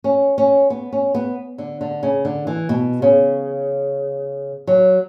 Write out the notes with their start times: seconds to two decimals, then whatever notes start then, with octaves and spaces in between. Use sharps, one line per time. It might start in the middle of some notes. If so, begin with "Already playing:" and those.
0.04 C#4
0.38 C#4
0.70 B3
0.93 C#4
1.15 B3
1.58 D3
1.81 D3
2.03 C#3
2.25 D3
2.47 E3
2.69 B2
3.02 C#3
4.67 F#3